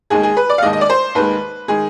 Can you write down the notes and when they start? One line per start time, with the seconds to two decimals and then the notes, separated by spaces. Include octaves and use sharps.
0.10 D#2 D#3 G#3 G#4
0.23 G#4
0.37 B4
0.50 D5
0.58 F5
0.62 D#2 D#3 G#3 D#5
0.73 D#5
0.81 D5
0.90 C5
1.15 D#2 D#3 G#3 B4
1.68 D#3 G#3 G#4